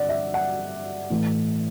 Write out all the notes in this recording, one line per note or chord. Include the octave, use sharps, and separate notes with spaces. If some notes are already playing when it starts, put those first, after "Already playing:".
Already playing: G2 D3 D5 F#5
E5
F#5
A2 E3 A3